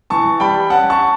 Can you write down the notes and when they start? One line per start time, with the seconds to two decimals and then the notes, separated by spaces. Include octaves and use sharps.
0.10 E3 A5 C#6
0.40 G3 G5 B5
0.70 C#4 F#5 A5
0.90 A5 C#6